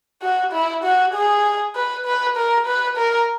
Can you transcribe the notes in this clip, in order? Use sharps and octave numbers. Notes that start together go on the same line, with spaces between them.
F#4
E4
F#4
G#4
B4
B4
A#4
B4
A#4